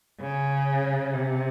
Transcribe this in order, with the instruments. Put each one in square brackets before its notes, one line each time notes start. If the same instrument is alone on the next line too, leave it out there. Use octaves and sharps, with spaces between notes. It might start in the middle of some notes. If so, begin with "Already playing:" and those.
[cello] C#3
C3